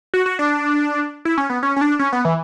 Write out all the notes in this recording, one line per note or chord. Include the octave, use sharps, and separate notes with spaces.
F#4
F#4
D4
E4
C#4
B3
C#4
C#4
D4
C#4
B3
E3